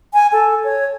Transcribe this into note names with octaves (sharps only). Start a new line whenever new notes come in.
G#5
A4
C#5